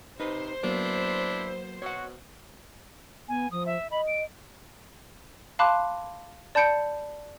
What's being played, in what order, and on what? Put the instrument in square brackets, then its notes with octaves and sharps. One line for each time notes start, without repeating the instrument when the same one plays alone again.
[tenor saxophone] C3 [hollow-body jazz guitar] D#4 B4 [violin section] C5
[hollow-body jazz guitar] F#3 A#3 B3 [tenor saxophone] D4 [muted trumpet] E4
[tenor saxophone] B2 [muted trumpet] F#4 [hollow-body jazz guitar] C#5 F#5
[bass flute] B3 [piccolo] G#5
[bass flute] F3 [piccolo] D#6
[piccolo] E5
[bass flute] D#5 [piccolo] B5
[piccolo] D7
[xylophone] F5 A5 B5 C6 D6 F#6
D5 A5 B5 G6 C#7 D7